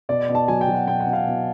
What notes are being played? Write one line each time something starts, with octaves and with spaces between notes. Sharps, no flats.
B2 D5
B2
A5
F#3 G#5
G5
F#3
F#5
B2 G5
F#5
B2
F5
B2